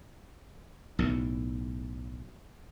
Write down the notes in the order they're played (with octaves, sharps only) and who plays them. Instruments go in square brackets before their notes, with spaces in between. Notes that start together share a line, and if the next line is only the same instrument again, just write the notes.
[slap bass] B1 A2